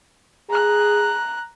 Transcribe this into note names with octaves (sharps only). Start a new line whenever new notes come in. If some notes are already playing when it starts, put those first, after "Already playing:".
G#4 A#5 F#6